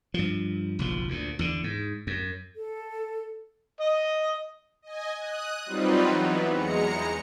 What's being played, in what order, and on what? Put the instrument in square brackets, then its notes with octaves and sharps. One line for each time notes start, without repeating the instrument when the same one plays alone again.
[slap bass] G2 F3
F#1 B1 F3
D2 A#2
E2 D3
G#2
F#2
[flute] A4
[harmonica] D#5
[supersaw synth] D#5 G#5
D#6 F#6
F#3 G3 C4 D#4 F4 B4
E3 F#3 B3
E2 G#3 A#5 C#7